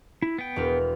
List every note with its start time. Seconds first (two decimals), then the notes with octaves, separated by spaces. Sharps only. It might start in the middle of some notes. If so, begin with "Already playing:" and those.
0.22 E4
0.38 B3 G5
0.56 E1 E2 F6